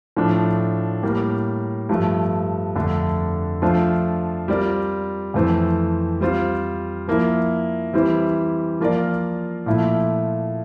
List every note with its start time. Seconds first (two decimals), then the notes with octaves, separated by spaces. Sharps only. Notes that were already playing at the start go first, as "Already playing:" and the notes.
0.16 A2 F3 A3 D4
1.03 A2 G3 A#3
1.89 G2 F3 A3
2.76 F2 D3 A3 D4 A4
3.62 F3 A3 D4 F4 C5
4.48 G3 C4 F4 A#4 D5
5.34 F2 E3 A3 C4
6.21 G3 C4 F4
7.08 F3 A#3 E4
7.94 E3 G3 C4 E4
8.81 F3 A#3 F4 A#4 D5
9.66 A#2 F3 A3 E4